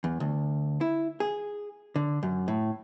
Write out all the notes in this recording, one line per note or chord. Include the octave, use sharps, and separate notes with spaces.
E2
D2
E4
G#4
D3
F#2
A2